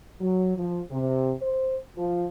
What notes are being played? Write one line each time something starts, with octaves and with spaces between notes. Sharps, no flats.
F#3
F3
C3
C5
F3